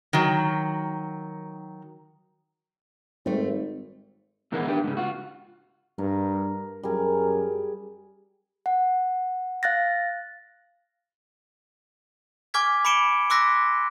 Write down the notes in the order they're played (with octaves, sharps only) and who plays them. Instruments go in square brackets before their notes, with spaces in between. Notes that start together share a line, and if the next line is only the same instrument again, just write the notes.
[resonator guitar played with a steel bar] D#3 F#3
[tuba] G#1 [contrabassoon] G#2 [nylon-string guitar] G3 A3 [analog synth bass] C4
[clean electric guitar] A#2 D#3 E3 G#3 A#3 B3
D4 G4 B4 G5
G#2 C#3
F4 F#4
[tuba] G2 [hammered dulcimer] A#4
[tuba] F#2 [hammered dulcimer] G3 G#4 [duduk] A#4
[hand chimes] F#5
F5 F#6 A6 A#6
[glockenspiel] G#5 C#6 D6 F6 G#6 B6
B5 D6 C#7 D7 E7 G7
C6 D6 E6 F#6 A#6 B6